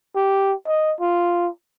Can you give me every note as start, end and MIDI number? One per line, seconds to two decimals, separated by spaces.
0.16 0.54 67
0.67 0.94 75
1.00 1.49 65